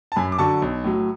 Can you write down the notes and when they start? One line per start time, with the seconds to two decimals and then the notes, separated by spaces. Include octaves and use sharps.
0.12 A5
0.16 F#2 G#5 B5
0.32 D6
0.39 D3 F#3 A5 C#6
0.62 B1
0.84 A2 F#3